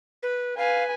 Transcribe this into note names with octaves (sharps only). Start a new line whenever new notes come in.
B4
B4 F5 G#5